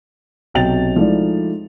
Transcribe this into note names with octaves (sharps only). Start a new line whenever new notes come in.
B1 C3 F#3 G5 A6 F7
F3 G#3 A3 D#4 E4 D5